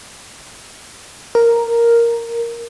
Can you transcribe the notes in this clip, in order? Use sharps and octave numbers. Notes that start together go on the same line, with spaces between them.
A#4